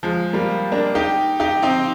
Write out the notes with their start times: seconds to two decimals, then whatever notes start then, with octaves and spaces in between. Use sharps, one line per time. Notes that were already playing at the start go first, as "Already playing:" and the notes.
0.03 F3 G#3
0.33 G3 A#3
0.72 A#3 D4
0.95 D#4 G4
1.40 D#4 G4
1.62 C4 D#4